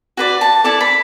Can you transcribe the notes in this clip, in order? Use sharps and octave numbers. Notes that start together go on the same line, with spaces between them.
F#4 B4 D5
A5
E4 A4 D5 A5
B5